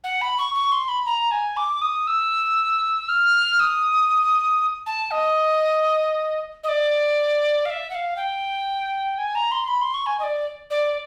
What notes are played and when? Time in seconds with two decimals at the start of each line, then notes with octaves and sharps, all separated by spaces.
0.04 F#5
0.21 B5
0.38 C#6
0.55 C#6
0.72 C6
0.88 B5
1.06 A#5
1.31 G#5
1.57 D6
1.81 D#6
2.07 E6
3.08 F6
3.60 D#6
4.86 A5
5.11 D#5
6.63 D#5
6.68 D5
7.65 F5
7.70 E5
7.90 F#5
7.95 F5
8.16 G5
9.18 G#5
9.35 A#5
9.51 C6
9.68 B5
9.81 C6
9.94 C#6
10.06 G#5
10.19 D#5
10.23 D5
10.70 D5